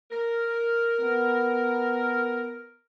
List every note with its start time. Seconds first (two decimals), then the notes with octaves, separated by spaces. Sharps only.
0.11 A#4
1.00 B3